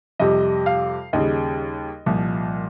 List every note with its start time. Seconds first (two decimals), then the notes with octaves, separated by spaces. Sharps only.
0.19 F2 C3 G3 D#5
0.66 F5
1.13 D#2 C#3 G3 D#5
2.06 C2 A#2 F3